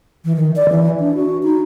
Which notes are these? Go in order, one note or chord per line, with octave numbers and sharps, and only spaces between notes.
E3
D#3
D5
E3
D4
F#4
D#4